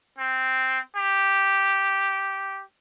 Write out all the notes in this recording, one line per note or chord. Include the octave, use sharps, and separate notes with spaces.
C4
G4